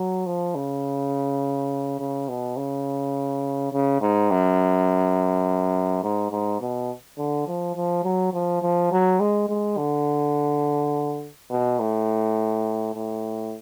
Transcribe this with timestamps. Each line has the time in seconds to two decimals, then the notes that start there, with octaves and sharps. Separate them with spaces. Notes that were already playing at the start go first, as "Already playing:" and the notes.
Already playing: F#3
0.26 F3
0.55 C#3
2.00 C#3
2.29 B2
2.57 C#3
3.73 C#3
4.01 G#2
4.31 F#2
6.03 G#2
6.31 G#2
6.61 B2
7.18 D3
7.48 F3
7.76 F3
8.04 F#3
8.34 F3
8.62 F3
8.92 F#3
9.20 G#3
9.49 G#3
9.77 D3
11.51 B2
11.80 A2
12.95 A2